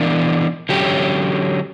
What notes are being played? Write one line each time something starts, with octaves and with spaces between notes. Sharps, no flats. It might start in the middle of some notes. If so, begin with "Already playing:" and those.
Already playing: E3 B3 D4 A#4
D3 F#3 C#4 G4